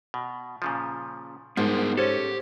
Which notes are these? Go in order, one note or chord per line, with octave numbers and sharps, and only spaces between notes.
B2
A#2 C#3 F3
G#2 F3 B3 G#4 A#4
C#4 G4 A4 C5 C#5